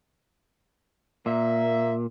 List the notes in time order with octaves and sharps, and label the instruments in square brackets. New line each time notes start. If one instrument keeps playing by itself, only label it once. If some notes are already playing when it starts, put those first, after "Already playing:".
[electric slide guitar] A#2 [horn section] A#3 E5